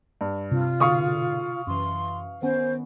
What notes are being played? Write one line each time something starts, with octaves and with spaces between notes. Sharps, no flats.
G2
C3 F4
G#2 B2 D3 F5 C#6 D#6
F#2 E3 C6
D#3 B3 C#4 C5